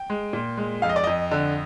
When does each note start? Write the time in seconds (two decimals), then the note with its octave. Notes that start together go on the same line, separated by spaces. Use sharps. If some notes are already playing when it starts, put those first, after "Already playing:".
Already playing: G5
0.10 G#3
0.33 A#2
0.58 G#3
0.82 F2 F5
0.89 D#5
0.96 D5
1.04 F2 D#5
1.31 D3